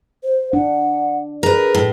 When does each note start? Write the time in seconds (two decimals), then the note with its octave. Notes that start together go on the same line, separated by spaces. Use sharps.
0.23 C5
0.53 D4 F#5
1.43 G#4 A#4 B4
1.75 A2